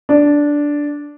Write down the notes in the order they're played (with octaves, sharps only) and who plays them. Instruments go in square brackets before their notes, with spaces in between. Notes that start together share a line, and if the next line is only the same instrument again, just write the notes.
[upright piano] D4